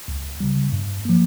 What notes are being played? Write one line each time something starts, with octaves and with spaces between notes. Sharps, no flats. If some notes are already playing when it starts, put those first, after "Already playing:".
C#2
C#3 G3
G2
F3 A#3